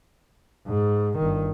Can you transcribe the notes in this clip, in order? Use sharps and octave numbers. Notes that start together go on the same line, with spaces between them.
G#2
G1 D#3